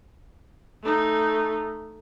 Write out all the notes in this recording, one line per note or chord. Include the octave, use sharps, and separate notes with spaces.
A3 D#4